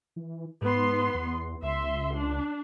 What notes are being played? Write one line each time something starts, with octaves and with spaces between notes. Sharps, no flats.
E3
G#2 B3 C6
E2
C#2 E5 C6
D4